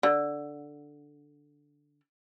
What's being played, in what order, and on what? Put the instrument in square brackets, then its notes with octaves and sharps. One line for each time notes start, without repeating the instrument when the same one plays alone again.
[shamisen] D3